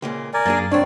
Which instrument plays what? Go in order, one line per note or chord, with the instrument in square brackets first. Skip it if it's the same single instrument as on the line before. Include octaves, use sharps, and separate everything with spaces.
[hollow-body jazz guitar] C#2 A#2 G#3
[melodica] A#4 D5 G#5
[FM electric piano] F#2 A6 [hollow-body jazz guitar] A#3 D4 G#4
[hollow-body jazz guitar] C2 C4 [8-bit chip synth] D4 D5 [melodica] C#5